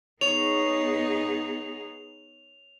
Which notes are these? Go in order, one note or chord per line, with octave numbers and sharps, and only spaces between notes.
B3 D#4 G#4 C#5 F7